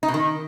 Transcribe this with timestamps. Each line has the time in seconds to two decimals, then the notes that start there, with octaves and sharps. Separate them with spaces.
0.03 D#4
0.08 B2
0.14 D#3